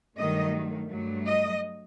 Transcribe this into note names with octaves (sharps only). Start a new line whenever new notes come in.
G2 D#3 F#3 A3 D#5
G2 F#3 A3
D#5